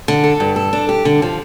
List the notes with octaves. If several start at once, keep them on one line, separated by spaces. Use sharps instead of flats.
D3
A4
G2
A4
D4
G4
D3
F3